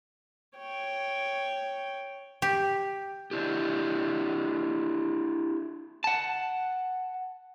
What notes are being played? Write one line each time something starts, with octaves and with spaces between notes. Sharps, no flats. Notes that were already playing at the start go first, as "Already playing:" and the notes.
C#5 G5
G4
D4 E4 G4
F#5 A5